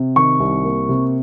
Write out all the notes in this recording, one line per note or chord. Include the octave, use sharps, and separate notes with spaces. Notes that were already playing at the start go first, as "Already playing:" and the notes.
Already playing: C3
D#3 C#6
C2
A#3
C3